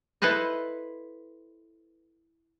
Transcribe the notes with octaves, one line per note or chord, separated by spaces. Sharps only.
E4 A4 B4 C5 D#5